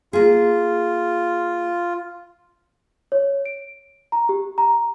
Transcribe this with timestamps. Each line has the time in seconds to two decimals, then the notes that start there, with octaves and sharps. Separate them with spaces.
0.13 A#3 F4 G#4
3.12 C#5
3.46 D7
4.12 A#5
4.29 G4
4.58 A#5